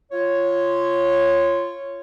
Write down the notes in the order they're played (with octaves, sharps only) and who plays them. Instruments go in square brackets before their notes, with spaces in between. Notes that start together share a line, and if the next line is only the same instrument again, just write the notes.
[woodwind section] F4 C#5